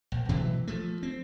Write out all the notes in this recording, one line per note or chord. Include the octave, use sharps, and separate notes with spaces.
A#1
B2 E3 F#3 A3
F3 A3
C4